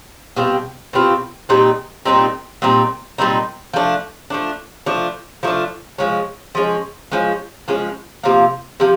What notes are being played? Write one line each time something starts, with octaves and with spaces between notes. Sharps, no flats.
B2 G3 C4 F4
B2 G3 C4 F4
A#2 G3 C4 D#4
A#2 G3 C4 D#4
A#2 G3 C4 D#4
A#2 G3 C4 D#4
F3 A3 D4
F3 A3 D4
F3 A3 D4
F3 A3 D4
F3 G#3 C#4
F3 G#3 C#4
F3 G#3 C#4
F3 G#3 C#4
C3 F3 A#3
C3 F3